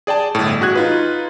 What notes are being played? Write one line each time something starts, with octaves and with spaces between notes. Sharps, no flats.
G#4 D5 G5 A5
G1 A2
A1 F#4 G#4 F#6 G#6
D#4 F4 B4